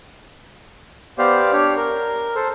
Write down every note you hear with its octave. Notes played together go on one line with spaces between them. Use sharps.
B3 G4 C5 D5 F5
D4 G4 C#5
A#4
A4 C5